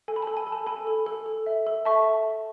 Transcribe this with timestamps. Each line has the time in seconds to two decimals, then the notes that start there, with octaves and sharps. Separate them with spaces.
0.08 A4 G#5
0.16 B5
0.22 A4 A5
0.37 G#5
0.47 A4
0.52 A5
0.67 A4 G#5 B5
0.87 A4
1.06 A4
1.26 A4
1.46 E5
1.67 A4
1.85 E5 A5 C#6